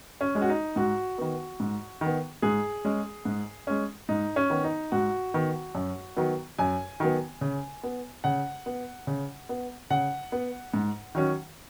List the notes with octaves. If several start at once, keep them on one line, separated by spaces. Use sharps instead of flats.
C#4
G#3 C#4
F#4
D#4
G#2 F#4
D#3 B3
G#2
D#3 B3
G#2 G#4
G#3 C#4
G#2
G#3 C#4
G#2 D#4
C#4
D#3 B3
D#4
G#2 F#4
D#3 B3
F#2
D#3 F#3 B3
F#2 G#5
D#3 F#3 B3
C#3
B3
C#3 F#5
B3
C#3
B3
C#3 F#5
B3
G#2
D#3 F#3 C#4